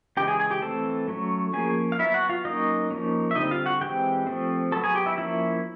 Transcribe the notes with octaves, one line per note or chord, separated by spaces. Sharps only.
C#3 E3 G#3 G4 G5
G#4 G#5
G#4 G#5
G4 G5
E3 A3 C4 A4 A5
F#3 A3 C#4
F3 A#3 C#4 G#4 G#5
F5
F#3 B3 E4 E5
F#4 F#5
F4 F5
F#3 A#3 C#4 D#4 D#5
F3 A#3 C#4
E5
D3 G3 C4 D#4 D#5
F4 F5
F#4 F#5
E3 G#3 C4 G4 G5
F3 A3 C4
F#3 B3 A4 A5
G#4 G#5
G4 G5
E4 E5
F3 A#3 C#4 E4 E5